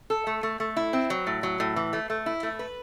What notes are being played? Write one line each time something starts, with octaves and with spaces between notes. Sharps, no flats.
A4
A3
A3
A3
E4
C4
F#3
A2
F#3
A2
E3
A3
A3
E4
A3
B4